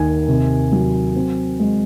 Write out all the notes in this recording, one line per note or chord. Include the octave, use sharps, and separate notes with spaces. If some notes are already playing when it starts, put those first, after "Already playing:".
Already playing: D#2 D#3 G#5
C3
F#3
C4
G#3